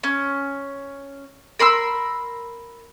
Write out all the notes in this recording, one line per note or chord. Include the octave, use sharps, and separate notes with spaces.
C#4
A#4 B5 C6 E6